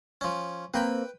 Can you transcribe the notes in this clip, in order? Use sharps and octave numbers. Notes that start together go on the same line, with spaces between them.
F3 C#4
A#3 C4 B4 G5 B5